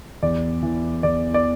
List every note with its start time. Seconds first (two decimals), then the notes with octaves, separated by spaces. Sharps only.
0.23 E2 D5
0.63 E3
1.03 E2 D5
1.34 D5